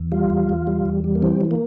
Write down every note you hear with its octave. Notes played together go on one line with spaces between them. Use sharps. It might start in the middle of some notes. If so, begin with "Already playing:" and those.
Already playing: E2
G3 F4
E2
E2
G3
E2
G3
A#3
E3 C4
E3
A#3